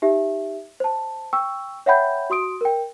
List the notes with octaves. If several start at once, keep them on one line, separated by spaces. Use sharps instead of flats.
D#4 G4 E5
C5 A5
G5 C#6 E6
C#5 E5 F#5 G5 B5 G6
F#4 C6 D#6 D7
A#4 G5